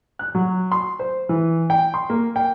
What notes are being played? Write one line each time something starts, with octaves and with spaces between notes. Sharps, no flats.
F#6
F#3
C6
C5
E3
G5
C6
A#3
G5